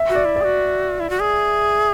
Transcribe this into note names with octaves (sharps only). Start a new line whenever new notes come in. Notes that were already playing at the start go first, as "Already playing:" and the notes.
Already playing: E5
F#4
D5
E4
G#4 D5
F#4
E4
F#4
G#4